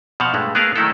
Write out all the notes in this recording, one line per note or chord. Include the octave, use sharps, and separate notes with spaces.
B2 F3 C5 F5 F#5
G2 G#3 A3
A3 B3 G#4 A#4 F5
D#3 F#3 A3 D#4 E4 A4